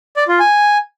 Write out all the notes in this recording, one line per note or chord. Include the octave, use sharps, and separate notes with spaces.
D5
F4
G#5